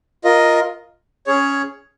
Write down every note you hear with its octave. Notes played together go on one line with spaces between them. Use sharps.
F4 A#4 D#5
C#4 G#4 C#5